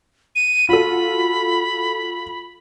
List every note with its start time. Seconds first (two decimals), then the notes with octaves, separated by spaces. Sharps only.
0.36 D#7
0.69 F4 F#4 A4 B5